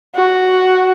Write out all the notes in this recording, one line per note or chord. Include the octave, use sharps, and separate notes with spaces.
F#4